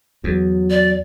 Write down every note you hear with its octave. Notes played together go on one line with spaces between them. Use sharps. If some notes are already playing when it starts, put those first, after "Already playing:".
E2 F#3
D5